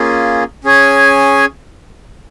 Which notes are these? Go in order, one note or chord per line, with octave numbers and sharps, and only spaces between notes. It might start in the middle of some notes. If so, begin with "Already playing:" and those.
Already playing: A#3 C#4 F4 G#4
C#4 G#4 C#5 G#5